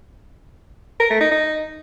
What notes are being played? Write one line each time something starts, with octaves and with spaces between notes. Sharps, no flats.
A#4
A3
D#4
D#4